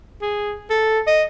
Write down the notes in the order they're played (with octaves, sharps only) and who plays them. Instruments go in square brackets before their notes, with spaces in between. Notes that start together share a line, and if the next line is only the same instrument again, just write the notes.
[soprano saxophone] G#4
A4
D#5